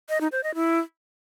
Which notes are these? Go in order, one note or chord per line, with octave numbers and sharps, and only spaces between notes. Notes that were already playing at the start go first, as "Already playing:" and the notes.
D#5
D#4
C5
D#5
E4